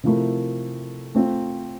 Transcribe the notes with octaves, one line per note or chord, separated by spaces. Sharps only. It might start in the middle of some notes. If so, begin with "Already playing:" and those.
C3 F3 A3 E4 A#4
A3 C4 F4